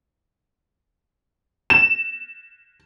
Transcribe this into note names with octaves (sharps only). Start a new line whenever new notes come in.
E7